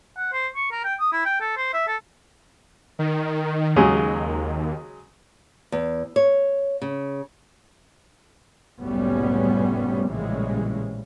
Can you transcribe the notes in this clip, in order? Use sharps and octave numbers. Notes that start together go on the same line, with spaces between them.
F#5
C5
C#6
A#4
G5
D#6
E4
G5
A4
C5
E5
A4
D#3
D#2 C#3 F#3 G#3
E2
C#5
C#3
F#1 C2 A2 G3 B3 C#4
A#1 A2 C#3 E3 G3 G#3